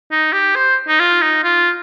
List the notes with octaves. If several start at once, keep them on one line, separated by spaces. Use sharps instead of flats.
D#4
G4
C5
D#4
F4
D#4
F4